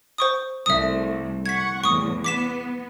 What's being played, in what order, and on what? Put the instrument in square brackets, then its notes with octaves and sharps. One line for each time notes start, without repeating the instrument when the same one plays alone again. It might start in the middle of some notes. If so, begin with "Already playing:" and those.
[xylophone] C5 C#6 D#6
[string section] C2 A3 [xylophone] E5 D#6
[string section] F#5 C#6 [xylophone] G#6 B6
[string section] E2 A2 [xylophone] C#6 D#6
[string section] B3 [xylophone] D6 B6 E7